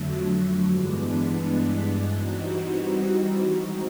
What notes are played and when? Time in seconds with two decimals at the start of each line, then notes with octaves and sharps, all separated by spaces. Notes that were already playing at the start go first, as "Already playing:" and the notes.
Already playing: F2 D3 F#3 A3
0.67 G2 E3 G#3 B3 D4
2.10 E3 G3 C4 D#4 F#4
3.52 D#3 G#3 C4 D#4 F#4